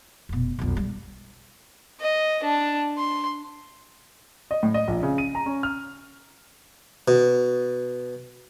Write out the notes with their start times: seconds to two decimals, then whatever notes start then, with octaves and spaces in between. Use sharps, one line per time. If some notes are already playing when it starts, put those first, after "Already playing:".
0.29 F1 B2
0.59 B1 F2
0.77 G3
2.01 D#5
2.43 D4
2.98 C6
4.51 D#5
4.63 A2
4.74 D#5
4.88 A#1
5.03 C#3
5.18 D#7
5.35 A#5
5.46 C#4
5.63 F6
7.08 B2